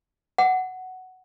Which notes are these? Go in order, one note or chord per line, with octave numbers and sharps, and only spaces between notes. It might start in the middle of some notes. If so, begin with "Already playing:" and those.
F#5